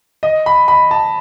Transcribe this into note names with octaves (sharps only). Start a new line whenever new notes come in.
D#5
B5
B5
A5